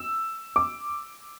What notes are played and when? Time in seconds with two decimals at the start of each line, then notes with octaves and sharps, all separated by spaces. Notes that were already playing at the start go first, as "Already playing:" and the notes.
Already playing: E6
0.56 D6